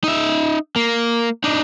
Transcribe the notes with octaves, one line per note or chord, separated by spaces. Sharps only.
D#4 E5
A#3
D4 D#4